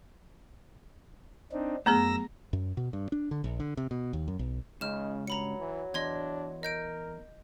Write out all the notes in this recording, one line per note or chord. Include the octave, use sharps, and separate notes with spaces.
C4 D4 D#4
F#2 A3 B3 G#4 A#5 E6 A#6
F#2
B2
G2
D4
D3
A#1
D3
C3
B2
D#2
F#2
B1
C#2 C#3 D#4 F6 E7
G2 F#3 A#5 B5 C#7
E3
E2 D4 D#5 C6 G#6
A#4 D#5 G6 D7